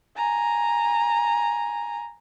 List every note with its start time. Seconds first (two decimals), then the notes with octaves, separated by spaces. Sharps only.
0.17 G#5 A#5